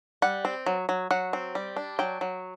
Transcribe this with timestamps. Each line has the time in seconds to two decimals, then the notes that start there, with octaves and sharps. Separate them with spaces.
0.22 G3 F#5
0.45 C4
0.66 F#3
0.89 F#3
1.11 F#3 F#5
1.33 C4
1.55 G3
1.76 D4
1.99 F#3 G5
2.21 F#3